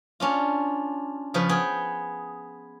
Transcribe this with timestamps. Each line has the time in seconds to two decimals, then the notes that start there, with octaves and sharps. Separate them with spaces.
0.20 C#4 D4 F4
1.34 C#3 F3 B4
1.49 B3 G#4 G5